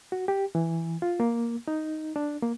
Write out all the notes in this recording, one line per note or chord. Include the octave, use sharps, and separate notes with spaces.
F#4
G4
E3
F4
A#3
D#4
D4
A#3